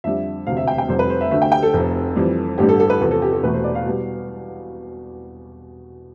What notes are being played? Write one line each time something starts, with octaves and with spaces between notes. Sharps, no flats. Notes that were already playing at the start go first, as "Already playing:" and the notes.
F2 D3 G3 E5
E1 D2 C3 F5
E5
G5
G5
F1 F2 C3 G3 C5
B4
C5
E5
D2 D3 A3 E5
G5
G5
A4
F1 F2 C3
F2 E3 G3
A1 G2 D3 G3 G4
A4
A4
B4
E2 C3 F3 A4
A4
G4
A4
E1 E2 B2 A3 B4
C5
D5
F5
B2 G3